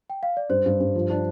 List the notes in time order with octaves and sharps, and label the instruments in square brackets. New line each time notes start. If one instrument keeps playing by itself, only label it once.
[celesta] G5
F5
D5
[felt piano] G2 [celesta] C5
[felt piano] G2
G2
F3
D4